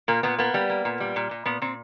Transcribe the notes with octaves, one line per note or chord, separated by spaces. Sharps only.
A#2 A#3
A#2 B3
A#3 B3
G3
A#3
A#2
G3
A#2
A#2
A#2 B3
A#2 C4